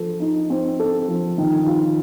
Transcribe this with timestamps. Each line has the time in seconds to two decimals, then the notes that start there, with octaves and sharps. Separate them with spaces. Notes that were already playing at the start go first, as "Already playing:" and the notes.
Already playing: F3 A4
0.20 D#4
0.50 C4
0.80 A4
1.08 F3
1.38 D#3
1.66 F4